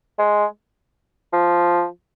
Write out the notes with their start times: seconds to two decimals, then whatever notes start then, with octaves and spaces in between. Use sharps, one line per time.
0.19 G#3
1.33 F3